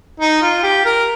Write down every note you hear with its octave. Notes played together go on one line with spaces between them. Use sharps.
D#4
F4
G4
A#4